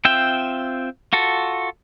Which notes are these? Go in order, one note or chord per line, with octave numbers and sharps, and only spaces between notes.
C4 F4 E5 G5
F4 F#4 A4